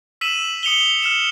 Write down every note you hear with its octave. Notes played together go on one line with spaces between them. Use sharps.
E6 B6 D#7 E7 F#7
D#6 C#7 F7 G7
F6 C#7 E7